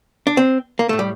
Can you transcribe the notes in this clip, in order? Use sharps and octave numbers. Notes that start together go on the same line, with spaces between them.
D4
C4
A#3
A2 A3
G3